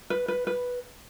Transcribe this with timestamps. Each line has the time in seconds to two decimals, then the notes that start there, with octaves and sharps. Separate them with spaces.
0.10 B4
0.28 B4
0.47 B4